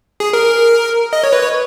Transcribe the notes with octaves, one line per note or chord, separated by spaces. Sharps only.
G#4
A#4
D#5
C#5
B4
C#5